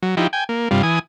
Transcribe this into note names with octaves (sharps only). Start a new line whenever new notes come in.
F#3
F3 D#4 E4 G4
G5 G#5
A#3
G2 C3 G3 F4
E3 G#5 D#6